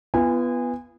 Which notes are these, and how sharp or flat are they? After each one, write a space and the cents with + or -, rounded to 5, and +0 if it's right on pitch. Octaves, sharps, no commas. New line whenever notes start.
B3 +0 F4 -40 G#5 -25